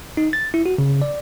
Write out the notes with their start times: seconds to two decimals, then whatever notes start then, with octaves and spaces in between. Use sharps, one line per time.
0.17 D#4
0.33 A6
0.54 E4
0.66 F#4
0.78 C#3
1.02 D5